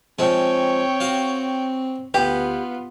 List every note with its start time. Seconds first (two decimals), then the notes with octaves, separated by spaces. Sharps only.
0.19 F3 G#3 C4 C#5 G5
1.00 F#4 F5
2.14 D2 B3 F4 G4 B4